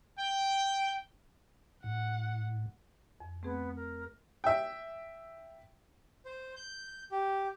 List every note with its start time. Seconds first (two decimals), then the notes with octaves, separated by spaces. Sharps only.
0.18 G5
1.84 A2 F#5
3.20 F2
3.43 A3 B3 C4 G#4
3.76 A#4
4.44 E5 G5
6.25 C5
6.56 G6
7.11 G4